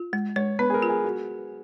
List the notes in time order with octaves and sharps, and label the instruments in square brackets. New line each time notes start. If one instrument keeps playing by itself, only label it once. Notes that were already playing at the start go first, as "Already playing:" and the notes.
Already playing: [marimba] F4
G#3
[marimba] G#3 [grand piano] C#5
[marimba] B3 [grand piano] B4
[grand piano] G#4
A#4
[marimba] F4
[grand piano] G#4
F#4